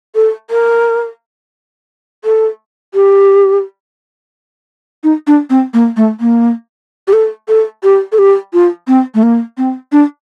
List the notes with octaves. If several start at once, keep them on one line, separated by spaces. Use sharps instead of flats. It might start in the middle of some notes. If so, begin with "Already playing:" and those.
A4
A#4
A4
G4
D#4
D4
C4
A#3
A3
A#3
G4
A4
A4
G4
A4
G4
F4
C4
A3
A#3
C4
D4